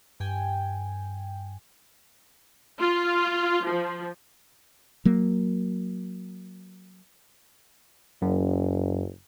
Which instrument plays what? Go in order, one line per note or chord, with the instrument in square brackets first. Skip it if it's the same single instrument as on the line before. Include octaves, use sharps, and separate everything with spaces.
[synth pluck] G2 G5 G#5
[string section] F4
F3
[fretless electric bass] F#3 A#3
[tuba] F#1 [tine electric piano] F#2